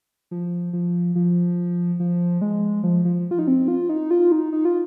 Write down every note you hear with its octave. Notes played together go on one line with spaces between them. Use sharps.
F3
F3
F3
F3
G#3
F3
F3
F4
D#4
C4
F4
D#4
F4
D#4
D#4
F4